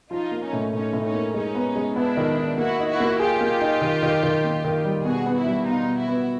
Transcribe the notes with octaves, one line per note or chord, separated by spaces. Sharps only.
F3 D#4 F4
A#3
C#4 D#4
A2
A2 C#4 D#4
A2
C#4 D#4
A#3
G#3 C#4 D#4
B3
G#3
B3 D4 E4
D#3
D#4
A#3 E4 F#4
D#4
E4 F#4
A#3
F4 G4 G#4
A#3
D#4
D#3
D#3
D#3
A#3
D#3
G3
B2 F#4 G#4
B3
E4 F#4
G3
B2 D#4 F4
B2
E4 F#4
B3